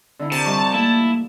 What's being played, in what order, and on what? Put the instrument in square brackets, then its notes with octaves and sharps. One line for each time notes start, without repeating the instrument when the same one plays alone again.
[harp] D3 D#4 E4
[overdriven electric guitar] C3 [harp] A#4 [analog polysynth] A5
[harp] F3 G3 D#5 [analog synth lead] C#6
[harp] A3 [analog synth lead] A#3 [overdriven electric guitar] E4